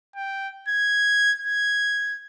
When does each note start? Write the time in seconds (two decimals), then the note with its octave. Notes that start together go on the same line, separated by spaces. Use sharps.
0.16 G5
0.68 G#6
1.41 G#6